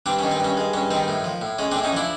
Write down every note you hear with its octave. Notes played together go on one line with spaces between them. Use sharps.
G2 C4 D4
C#4
D#3
C4
G2 C#4
G#3
G2 C#4
D#3 C4
A2
F3
A2
G#3 C#4
C4 D4
A2
C#4 D#4
F3 D4 E4